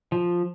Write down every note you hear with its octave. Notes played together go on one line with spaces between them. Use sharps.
F3